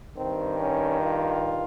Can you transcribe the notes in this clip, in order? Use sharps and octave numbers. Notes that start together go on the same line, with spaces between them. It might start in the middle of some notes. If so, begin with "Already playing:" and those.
G2 D#3 C4
C#4
F4